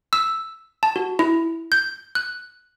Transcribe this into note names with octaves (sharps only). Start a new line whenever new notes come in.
E6
A5
F#4
E4
G6
F#6